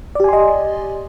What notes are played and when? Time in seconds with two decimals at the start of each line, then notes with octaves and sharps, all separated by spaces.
0.15 D5
0.20 G4
0.24 G#5
0.29 C6
0.33 D#5